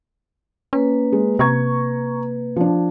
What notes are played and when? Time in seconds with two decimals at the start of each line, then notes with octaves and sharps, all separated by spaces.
0.73 A#3 C#4 B4
1.12 G#3
1.39 C3 A#5 C#6 G#6
2.56 F3 D4